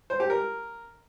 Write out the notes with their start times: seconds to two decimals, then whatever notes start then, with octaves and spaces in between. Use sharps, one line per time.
0.10 C5
0.20 G4
0.30 A#4